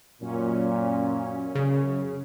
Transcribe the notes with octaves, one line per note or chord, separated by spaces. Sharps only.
F#2 A#2 C#4
C#3